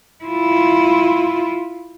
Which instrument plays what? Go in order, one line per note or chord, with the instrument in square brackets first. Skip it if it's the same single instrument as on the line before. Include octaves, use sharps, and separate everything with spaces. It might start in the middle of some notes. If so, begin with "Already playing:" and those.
[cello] E4 F4